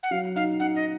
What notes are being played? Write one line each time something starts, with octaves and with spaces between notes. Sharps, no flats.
F#5
F#3 F5
D#4 F5
D#4 F#5
D#5